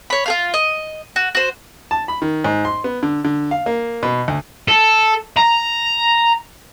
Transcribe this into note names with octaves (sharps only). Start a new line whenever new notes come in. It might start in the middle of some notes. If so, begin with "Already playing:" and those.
C#5 B5
F4 G#4 F5
D#5
F#4
F#4 C5
A5
B5
D#3
G#2
C6
B3
D3
D3
F5
A#3
B2
D2
A4
A#5